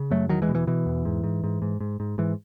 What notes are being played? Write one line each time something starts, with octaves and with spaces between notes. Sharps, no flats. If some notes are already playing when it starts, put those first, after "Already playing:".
Already playing: C#3
F#2 F#3 A3
E2 D#3 F#3
E3 G#3
B2
E3
B2 E3
E2
G#2
G#2
G#2
G#2
G#2
G#2
G#2 E3